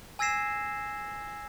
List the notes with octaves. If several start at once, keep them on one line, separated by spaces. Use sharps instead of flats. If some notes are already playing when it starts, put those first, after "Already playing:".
G#5 E6 G#6 A#6 C7 E7